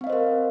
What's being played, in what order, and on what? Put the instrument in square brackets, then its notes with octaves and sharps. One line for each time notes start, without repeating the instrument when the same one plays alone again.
[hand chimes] C4
F5
D#5
C5
A#4